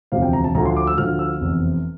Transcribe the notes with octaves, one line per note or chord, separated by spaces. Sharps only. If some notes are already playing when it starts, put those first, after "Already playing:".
E1 D2 C3 F3 F5
G5
A#5
A5
D2 D3 F3 A#5
C6
D6
E6
D2 D3 F3 F6
E6
F1 E2 C3